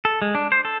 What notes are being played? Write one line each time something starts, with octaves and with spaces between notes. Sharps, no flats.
A4
G#3
D4
C5
A4